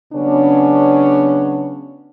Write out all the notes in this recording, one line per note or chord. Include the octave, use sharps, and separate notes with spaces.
C#3 F#3 B3 C#4 D4